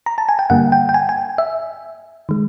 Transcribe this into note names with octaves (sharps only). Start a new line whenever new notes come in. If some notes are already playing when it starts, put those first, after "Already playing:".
A#5
A5
G#5
G5
G2 D3 G3 A#3 F#5
G5
G5
G#5
G#5
E5
D#3 G#3